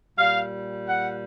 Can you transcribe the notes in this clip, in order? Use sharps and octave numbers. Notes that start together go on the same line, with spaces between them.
A#2 G3 F5
F#5